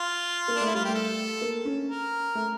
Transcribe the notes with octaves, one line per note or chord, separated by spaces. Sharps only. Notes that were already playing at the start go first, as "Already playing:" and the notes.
Already playing: F4
A#3
D4
A3 E4
G3 F4
A3 G4
A4
A#3
C#4
A#4
A3